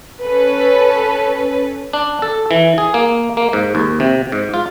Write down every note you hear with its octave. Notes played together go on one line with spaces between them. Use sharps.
C#4 A4 B4
D4
A4
E3
G#4
A#3
A#3
G#2
D#2
C3
G#2
F4